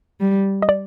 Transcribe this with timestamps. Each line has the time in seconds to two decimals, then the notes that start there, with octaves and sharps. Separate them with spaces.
0.20 G3
0.62 D#5
0.69 D5